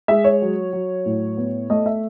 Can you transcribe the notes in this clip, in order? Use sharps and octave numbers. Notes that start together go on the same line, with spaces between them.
G#3 E5
C#5
F#3
F#3
A2
B3
A3 D#5
E5